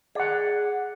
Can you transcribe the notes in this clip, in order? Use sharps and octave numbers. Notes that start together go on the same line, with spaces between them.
G#4 D5 F#5